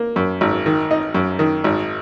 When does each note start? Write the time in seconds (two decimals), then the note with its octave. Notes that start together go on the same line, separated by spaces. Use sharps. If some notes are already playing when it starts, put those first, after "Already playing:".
Already playing: A#3
0.16 F#2
0.41 G#1
0.66 D#3
0.91 D#4
1.14 F#2
1.39 D#3
1.64 G#1